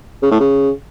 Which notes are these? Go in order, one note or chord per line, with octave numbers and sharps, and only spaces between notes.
C#3
A2
C#3